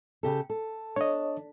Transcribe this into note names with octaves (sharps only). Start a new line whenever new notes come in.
C#3 G4 A4
A4
D4 C#5 D#5